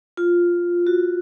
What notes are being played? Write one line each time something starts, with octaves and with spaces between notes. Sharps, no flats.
F4
F#4